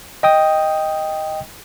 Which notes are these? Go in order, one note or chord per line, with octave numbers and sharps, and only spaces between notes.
D#5 G5 D#6